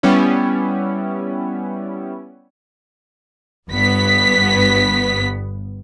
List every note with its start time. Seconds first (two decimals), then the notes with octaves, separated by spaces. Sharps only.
0.03 G3 B3 C#4 E4
3.70 G1 G2 B3 B6